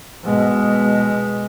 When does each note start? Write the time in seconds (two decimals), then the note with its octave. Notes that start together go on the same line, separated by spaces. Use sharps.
0.24 B2 G#3